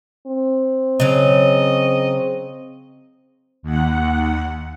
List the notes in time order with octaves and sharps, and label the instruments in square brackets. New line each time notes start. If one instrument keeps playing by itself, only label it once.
[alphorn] C4
[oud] C#3 F#3 [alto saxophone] D#5
[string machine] D#2 F#5